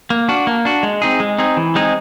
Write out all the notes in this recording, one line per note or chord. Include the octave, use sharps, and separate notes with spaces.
A#3
D4 F#4
A#3
D4 F#4
G#3
C4 D#4 G#4
G#3
C4 D#4 G#4
E3
G#3 C4 D#4 G#4